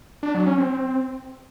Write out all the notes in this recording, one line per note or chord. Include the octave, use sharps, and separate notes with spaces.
D4
F#3
C#4
C4